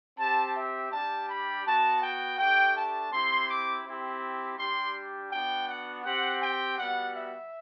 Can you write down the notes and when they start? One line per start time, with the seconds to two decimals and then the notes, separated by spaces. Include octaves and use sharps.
0.19 C4 G4 A5
0.56 E5
0.92 G3 D4 G4 A5
1.29 B5
1.65 B3 F#4 A5
2.02 G5
2.38 A3 D4 G4 G5
2.75 A5
3.12 C4 E4 G4 C6
3.48 D6
3.85 C4 E4 G4
4.58 G3 D4 G4 C6
5.31 B3 D4 F#4 G5
5.67 F#5
6.04 C4 G4 F#5
6.41 G5
6.77 G3 B3 F#4 F#5
7.14 E5